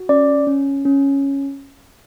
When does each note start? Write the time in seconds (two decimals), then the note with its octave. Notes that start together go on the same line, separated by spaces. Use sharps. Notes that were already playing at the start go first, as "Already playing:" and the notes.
Already playing: F#4
0.09 C#4 D5
0.47 C#4
0.85 C#4